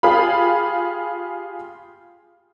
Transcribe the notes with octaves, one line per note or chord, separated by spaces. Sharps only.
F4 G4 G#4 F5 B5